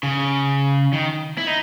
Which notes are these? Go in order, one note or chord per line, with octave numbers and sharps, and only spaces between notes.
C#3
D#3
E4
D#4